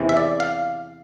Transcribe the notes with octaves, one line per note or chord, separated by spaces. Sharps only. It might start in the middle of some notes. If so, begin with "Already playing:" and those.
Already playing: E2 C3 E3
E5
D5
F5